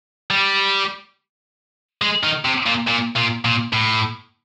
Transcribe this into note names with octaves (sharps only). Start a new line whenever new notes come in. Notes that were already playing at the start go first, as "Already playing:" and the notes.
G3
G#3
D#3
C3
A#2
A#2
A#2
A#2
A2